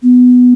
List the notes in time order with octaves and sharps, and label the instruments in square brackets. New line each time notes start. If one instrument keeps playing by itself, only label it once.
[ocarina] B3